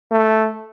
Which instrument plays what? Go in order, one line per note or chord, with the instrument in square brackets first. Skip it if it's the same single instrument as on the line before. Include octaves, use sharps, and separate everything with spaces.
[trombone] A3